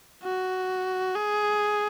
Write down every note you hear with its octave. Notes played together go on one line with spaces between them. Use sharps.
F#4
G#4